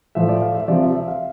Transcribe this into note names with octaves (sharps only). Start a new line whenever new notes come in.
A2 F3 E5
D5
F5
E5
C3 F3 D5
E5
E5
F5